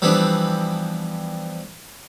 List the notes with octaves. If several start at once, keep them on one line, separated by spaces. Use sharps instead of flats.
E3 F3 G3 B3 C4 D4